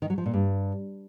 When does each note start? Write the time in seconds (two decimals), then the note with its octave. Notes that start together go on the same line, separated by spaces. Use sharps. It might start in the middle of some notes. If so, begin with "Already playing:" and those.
0.02 D#3
0.10 F#3
0.18 F3
0.26 A#2
0.33 G2